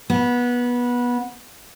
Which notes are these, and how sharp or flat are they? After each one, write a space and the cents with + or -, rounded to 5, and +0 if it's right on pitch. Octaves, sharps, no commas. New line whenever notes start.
B3 -20